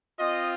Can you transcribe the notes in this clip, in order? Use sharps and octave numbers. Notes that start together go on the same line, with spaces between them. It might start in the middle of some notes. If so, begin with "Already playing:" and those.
C4 F4 D#5